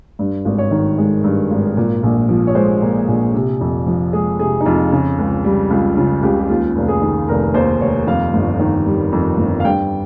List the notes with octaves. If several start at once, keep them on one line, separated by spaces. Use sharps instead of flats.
G2
G#1
C#5
D#3
G#3
G2
G#1
A#2
A#1
F3
C#5
G#3 C5
A#2
A#1
C3
F2
F3
G#3 G#4
C3 G#4
D#4
F2 F4
C#3
C#2
G3
C#2 F4
C#3 F4
C#2 G4
G4
D#2 F4
F1
G#4
D#3
F1 A#4
D#2 C5
F1 C#5
F2 F5
G1
D#3
G3
F2
G1
F5
G2 G5